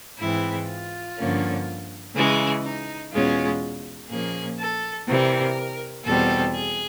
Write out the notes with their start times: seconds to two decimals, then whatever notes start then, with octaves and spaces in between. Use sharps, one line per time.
0.19 G#2 E3 G#3 C4 E4
0.68 F4
1.17 G2 D3 F3 A#3 C#4
2.15 C#3 E3 G#3
2.63 D#4
3.12 E2 B2 G#3 C#4 F4
4.09 A#2 F3 A#3 C#4 G#4
4.59 A4
5.08 C3 E3 G3 A#4
6.05 E2 B2 G3 C4 A4
6.54 G#4